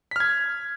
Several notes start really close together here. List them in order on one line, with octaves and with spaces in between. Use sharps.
B6 F6 G#6